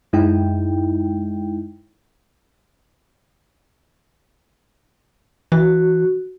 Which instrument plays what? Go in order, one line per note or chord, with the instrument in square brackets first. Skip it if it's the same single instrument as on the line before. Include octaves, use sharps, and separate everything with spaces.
[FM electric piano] F#2 G#3 D#4 E4 G5
[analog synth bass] E3 [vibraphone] F#4